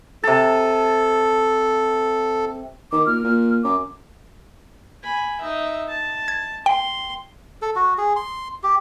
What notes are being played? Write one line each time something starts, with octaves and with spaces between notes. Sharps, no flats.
C3 A4 A5
D#3 D6
A#2 F6
A#2
F#2 D6
G#5 B5
D#4 E5
A5
G#6
G5 C6
A4
F#4
G#4
C6
G4